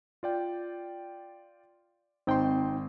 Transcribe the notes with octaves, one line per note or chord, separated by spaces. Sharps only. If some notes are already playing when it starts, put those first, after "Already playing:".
F4 D5 G5
G#1 C4 D#4 G5 C6